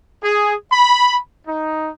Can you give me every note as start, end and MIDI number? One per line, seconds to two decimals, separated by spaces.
0.23 0.54 68
0.72 1.18 83
1.47 1.90 63